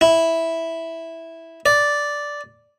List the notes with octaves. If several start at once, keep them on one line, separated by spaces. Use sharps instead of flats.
E4
D5